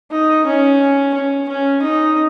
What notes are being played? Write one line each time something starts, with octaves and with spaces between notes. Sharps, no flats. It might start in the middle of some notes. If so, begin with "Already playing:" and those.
D#4
C#4
C#4
C#4
D#4